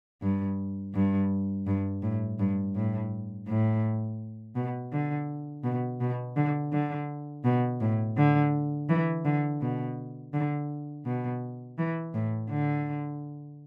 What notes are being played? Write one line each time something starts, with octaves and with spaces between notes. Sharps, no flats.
G2
G2
G2
A2
G2
A2
A2
B2
D3
B2
B2
D3
D3
B2
A2
D3
E3
D3
B2
D3
B2
E3
A2
D3